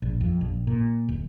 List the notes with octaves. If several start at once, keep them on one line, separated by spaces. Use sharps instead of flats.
A#1
F2
A#1
A#2
D1